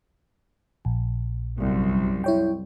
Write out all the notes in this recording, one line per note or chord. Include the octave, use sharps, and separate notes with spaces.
A#1
C2 F#2
E4 C#5 G5